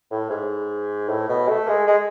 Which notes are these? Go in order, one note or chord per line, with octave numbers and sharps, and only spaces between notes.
A2
G#2
A2
B2
A3
G#3
G#3